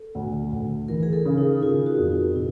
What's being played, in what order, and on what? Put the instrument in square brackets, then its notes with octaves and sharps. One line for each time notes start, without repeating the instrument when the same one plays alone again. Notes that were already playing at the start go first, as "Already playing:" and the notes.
Already playing: [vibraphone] A4
[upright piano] D2
D2
[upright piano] E3 [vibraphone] A#4
[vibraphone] G#4
A4
[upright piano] C#3
[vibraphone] D#4
[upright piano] C#3 [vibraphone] F4
[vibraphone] F#4
[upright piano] F2
[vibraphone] E4
[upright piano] C3 [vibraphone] E4